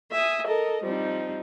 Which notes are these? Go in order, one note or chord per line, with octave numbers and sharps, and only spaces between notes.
E5 G#5 D#6
A4 A#4 D#5
F3 G3 C4 D#4